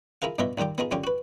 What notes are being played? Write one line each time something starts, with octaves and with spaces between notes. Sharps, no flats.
E4 F4 G#4 A#4 F5
G2 B2 B3 F4 D#5 E5
D#2 A#2 G3 F4 G4
B3 D#4 F4 G#4
F#2 D3 C#4 F4 G4
F#4 B4